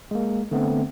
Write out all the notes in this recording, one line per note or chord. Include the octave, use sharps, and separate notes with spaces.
G#3 A#3
D3 A3 B3 C4